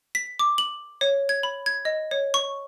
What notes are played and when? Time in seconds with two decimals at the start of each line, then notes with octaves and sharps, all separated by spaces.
0.15 B6
0.39 D6
0.58 F#7
1.01 C#5
1.29 G#6
1.43 B5
1.66 G#6
1.85 D#5
2.11 C#5
2.34 C#6